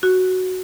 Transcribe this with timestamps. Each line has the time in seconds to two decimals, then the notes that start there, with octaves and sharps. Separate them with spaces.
0.03 F#4